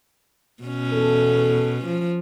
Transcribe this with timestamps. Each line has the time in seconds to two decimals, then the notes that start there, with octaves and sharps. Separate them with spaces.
0.63 B2 C#4
0.92 E2 A4
1.85 F3